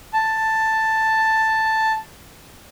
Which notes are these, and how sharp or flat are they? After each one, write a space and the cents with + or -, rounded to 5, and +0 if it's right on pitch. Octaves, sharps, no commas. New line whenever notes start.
A5 +5